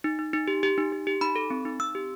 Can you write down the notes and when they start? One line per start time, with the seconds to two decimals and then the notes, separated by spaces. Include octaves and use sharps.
0.04 D#4
0.19 D#4
0.33 D#4
0.48 G4
0.63 G4
0.78 D#4
0.92 G4
1.07 G4
1.21 D#4 B5
1.36 A4
1.50 C4
1.65 D#4
1.79 C4 E6
1.95 G4